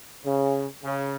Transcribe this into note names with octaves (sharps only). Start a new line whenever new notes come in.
C#3
C#3